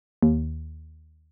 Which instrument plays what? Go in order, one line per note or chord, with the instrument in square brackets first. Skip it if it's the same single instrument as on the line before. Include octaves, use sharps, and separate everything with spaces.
[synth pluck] D#2